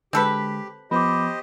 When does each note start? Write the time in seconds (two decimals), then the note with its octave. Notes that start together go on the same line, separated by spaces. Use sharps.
0.13 D3 G#3 C4 G4 A4 B4
0.91 F3 B3 G4 C5 D#5 B5 D6